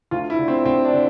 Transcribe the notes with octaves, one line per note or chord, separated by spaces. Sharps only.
D2 F4
E4
D3
C4
D2 C4
D4
D3